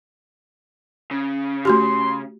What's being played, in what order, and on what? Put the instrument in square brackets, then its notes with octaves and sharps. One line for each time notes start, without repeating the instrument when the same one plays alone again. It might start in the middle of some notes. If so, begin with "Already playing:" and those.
[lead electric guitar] C#3
[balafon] A3 F#4 G4 [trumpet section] C6